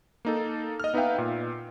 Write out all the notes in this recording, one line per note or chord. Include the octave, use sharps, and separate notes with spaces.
A#3 D#4 A4
D#5 F6
B3 D#4 B4 E5 F5 G5
A#2